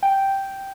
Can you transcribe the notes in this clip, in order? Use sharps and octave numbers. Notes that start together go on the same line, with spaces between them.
G5